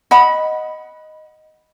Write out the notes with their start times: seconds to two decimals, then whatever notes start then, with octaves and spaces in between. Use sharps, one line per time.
0.11 D#5 F#5 B5